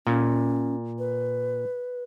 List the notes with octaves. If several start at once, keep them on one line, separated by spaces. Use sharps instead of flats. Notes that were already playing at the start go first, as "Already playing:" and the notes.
A#2 C#4
B4